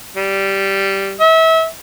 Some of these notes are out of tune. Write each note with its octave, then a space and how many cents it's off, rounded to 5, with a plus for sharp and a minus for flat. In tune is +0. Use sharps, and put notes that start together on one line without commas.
G3 -5
E5 -30